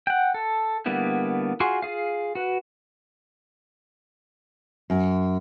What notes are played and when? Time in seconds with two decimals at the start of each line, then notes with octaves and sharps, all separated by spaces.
0.07 F#5 G5
0.34 A4
0.86 D3 G3 A#3 B3 E4
1.60 F4 F#4 G#4 C6 C#6
1.82 F4 G#4 F5
2.35 F#4 B4
4.90 F#2